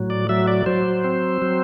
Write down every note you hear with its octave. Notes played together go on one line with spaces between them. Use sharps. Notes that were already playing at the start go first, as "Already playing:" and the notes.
Already playing: A2 F#3
D5
F#3 E5
D5
F#3 C5
C4
F#3